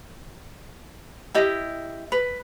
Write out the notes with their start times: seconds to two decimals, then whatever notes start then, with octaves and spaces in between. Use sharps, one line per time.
1.34 E4 G4 D#5
2.12 B4